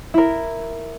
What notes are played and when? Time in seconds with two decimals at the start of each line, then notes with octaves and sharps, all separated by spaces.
0.14 E4 A#4